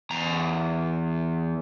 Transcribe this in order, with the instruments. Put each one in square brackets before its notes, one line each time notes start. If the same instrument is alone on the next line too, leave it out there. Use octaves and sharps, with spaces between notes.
[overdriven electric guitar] E2 A#5